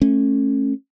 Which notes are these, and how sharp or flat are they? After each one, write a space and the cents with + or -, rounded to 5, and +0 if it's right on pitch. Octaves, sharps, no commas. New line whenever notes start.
A3 +0 C#4 -25